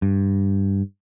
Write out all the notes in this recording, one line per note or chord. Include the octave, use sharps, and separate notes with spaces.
G2